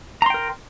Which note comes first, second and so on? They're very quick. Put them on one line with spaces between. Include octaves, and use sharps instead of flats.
A#5 C6 G5 A#4